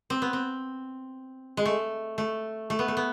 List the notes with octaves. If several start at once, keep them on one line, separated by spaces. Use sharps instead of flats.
C4
B3
C4
G#3
A3
A3
A3
B3
A3
B3